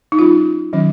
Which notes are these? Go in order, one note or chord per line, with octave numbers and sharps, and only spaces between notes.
D#4
F#3 C#4 F4
D#3 F#3 C#4